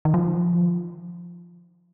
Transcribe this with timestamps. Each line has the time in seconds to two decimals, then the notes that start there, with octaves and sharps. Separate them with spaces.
0.05 D#3
0.14 F3